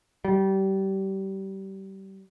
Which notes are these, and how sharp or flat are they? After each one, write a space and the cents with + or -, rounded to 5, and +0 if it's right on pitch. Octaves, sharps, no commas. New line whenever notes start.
G3 -25